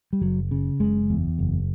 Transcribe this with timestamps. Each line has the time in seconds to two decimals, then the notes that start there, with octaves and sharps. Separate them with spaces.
0.13 G3
0.21 F#1 F#3
0.51 C#3
0.80 F#1 G#3
1.10 E2
1.39 F#1